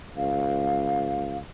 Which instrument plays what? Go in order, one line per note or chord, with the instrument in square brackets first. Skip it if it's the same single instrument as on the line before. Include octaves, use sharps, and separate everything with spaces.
[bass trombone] C#2 [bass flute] F5